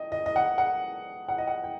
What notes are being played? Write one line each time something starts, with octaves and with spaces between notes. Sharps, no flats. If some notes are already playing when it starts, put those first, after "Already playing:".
Already playing: D#5 G5
D#5
D#5
F#5
F#5
F#5
D#5
F#5
G5